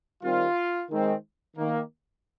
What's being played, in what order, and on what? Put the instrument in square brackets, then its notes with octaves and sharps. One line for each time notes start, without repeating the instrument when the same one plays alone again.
[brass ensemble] D#3 G3 C4 F4
D#3 G#3 C4
D#3 A#3